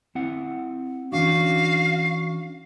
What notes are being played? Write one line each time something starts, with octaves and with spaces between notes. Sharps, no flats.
C4 E4 F#5
E3 C#4 D4 F#4 F5